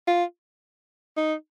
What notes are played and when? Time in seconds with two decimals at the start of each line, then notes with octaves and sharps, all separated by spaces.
0.07 F4
1.17 D#4